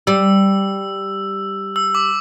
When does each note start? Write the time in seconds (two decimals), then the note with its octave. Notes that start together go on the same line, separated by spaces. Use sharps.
0.07 G3 E6
1.76 E6
1.95 D6